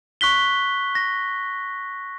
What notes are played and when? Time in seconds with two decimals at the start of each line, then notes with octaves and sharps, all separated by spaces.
0.21 C#6 F#6 B6 G7
0.95 A#6